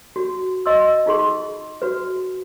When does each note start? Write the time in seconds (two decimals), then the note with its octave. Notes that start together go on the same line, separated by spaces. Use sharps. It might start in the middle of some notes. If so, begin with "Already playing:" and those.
0.16 F#4
0.66 D#5 C6 E6
1.06 D#4 F4 G#4 C6
1.82 F#4 B4